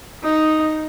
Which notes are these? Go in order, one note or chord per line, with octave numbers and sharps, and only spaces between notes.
D#4